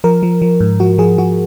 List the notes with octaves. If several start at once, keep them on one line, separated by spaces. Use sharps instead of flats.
F3 A#4
F3
F3
G#2
F3 F#4
F3 G#4
F3 F#4